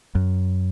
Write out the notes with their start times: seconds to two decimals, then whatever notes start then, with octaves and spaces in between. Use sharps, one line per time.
0.15 F#2